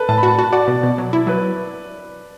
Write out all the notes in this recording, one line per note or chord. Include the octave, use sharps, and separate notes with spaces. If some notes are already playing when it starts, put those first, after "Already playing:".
Already playing: A4 B4
A2 A5
B5
F#4 A5
F#4 A5
F#4 D5
B2
B2
F#3
E4
F#3 B4